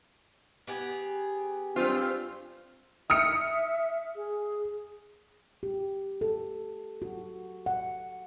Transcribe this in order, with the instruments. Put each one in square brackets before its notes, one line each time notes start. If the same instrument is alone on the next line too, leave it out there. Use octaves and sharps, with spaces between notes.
[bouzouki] B3 G4 G#4
[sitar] G2 F4 [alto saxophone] C4
[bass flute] E5 [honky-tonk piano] D#6 F6 C#7
[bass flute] G#4
[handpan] G4
A4
F#4
F#5